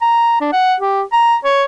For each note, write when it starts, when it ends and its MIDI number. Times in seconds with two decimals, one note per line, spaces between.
0.01 0.38 82
0.41 0.49 62
0.53 0.74 78
0.80 1.02 67
1.13 1.36 82
1.44 1.64 73